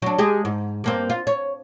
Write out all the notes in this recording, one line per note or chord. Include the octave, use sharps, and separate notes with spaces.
F#3 D4
G#3 G4 G#4
G#2
G2 A#3 C4
F4
C#5